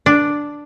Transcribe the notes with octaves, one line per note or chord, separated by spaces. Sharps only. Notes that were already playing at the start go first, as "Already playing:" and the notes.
D4